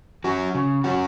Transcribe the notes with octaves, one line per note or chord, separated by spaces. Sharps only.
F#3 C#4 F#4
C#3
F#3 C#4 F#4